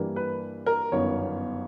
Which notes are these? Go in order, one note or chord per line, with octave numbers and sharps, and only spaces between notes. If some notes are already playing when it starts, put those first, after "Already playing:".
Already playing: G2 E3 G3 A#3
B4
A#4
G1 F#2 D#3 F#3 B3 C#5